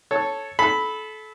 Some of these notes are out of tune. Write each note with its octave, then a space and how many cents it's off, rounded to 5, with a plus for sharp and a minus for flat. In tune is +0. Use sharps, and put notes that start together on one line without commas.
A4 +0 C#5 +0
A4 -25 B5 +0